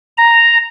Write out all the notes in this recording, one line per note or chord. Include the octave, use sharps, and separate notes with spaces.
A#5